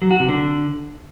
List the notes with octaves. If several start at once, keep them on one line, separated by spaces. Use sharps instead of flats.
F#3
F#4
C3
D3